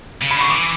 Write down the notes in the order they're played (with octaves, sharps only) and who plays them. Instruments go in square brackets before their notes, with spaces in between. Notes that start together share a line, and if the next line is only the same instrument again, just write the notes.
[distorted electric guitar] C#3
[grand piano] B5
[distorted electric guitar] D3 [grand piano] C#6
[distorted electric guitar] E3 [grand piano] D6